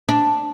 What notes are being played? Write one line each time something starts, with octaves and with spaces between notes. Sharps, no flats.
D4